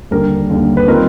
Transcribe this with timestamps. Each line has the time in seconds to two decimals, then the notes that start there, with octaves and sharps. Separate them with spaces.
0.11 D#2 D3 G3 A#4
0.50 D#2 D3 G3
0.77 B4
0.87 D#3 G3 C4 F4 A#4